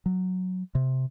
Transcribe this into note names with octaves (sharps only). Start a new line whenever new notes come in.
F#3
C3